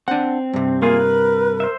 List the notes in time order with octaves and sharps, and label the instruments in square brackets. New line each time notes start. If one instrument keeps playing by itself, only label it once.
[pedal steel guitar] C4 [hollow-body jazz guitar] D4 F#5
[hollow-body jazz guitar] G2 C3
[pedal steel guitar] A#3 F4 G#4 [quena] A#4
[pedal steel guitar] B4
C5 E5